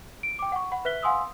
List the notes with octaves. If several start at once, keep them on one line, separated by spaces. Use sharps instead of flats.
D7
G5 D6
F#5 C#6
F#5 B5
B4 E5 F#6 B6 G7
F5 F#5 G#5 C6 D#6 E6